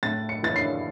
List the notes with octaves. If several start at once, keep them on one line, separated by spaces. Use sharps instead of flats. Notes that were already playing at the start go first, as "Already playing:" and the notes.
A2 A6
C#7
E3 A6
C7